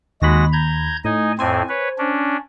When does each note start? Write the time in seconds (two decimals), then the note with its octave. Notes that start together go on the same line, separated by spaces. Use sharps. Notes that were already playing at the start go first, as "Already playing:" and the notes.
0.22 D#2 G#3 F#4 B5 A#6
0.53 A#5 G6 G#6
1.05 A2 D#4 D#5 G#5
1.39 F2 A2 C4 C5 G#5
1.69 B4 C#5
1.98 C#4 D4